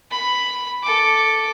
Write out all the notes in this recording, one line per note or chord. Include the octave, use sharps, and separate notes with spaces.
B5
A4 D6